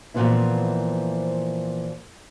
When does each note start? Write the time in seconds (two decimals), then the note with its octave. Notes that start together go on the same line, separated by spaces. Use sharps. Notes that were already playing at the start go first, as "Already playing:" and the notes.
0.14 A#2 E3 F3 B3 C4 E4